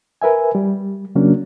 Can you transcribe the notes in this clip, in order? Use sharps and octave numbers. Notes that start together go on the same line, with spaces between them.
A#4 B4 E5 G#5
G3
C#3 F#3 A#3 C#4 D4